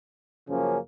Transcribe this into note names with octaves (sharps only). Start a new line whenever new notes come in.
F#2 C#3 F3 A#3 C#4